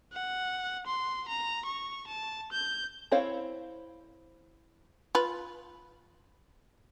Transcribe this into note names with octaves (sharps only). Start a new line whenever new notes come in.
F#5
C6
A#5
C#6
A5
G6
C4 E4 C5 C#5 F5
F4 B4